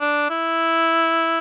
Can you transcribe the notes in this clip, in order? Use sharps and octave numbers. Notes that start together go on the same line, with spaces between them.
D4
E4